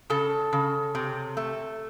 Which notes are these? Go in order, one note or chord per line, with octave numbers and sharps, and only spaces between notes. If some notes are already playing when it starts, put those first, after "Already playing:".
C#3 A4
C#3
C3
A3